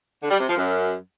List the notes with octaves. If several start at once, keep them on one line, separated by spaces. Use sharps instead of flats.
D3
G3
C3
F3
F#2